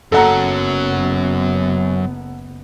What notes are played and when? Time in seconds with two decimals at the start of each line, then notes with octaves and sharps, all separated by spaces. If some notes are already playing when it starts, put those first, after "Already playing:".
0.12 F#1 F#2 F#3 B3 A4 F#5 A#5